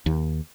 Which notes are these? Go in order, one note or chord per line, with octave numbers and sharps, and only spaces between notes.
D#2